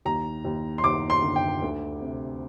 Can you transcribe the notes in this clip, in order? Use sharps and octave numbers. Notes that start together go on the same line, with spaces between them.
D#2 A#5
D#2
C6
D#2 D6
C6
D3
G5
D2
C3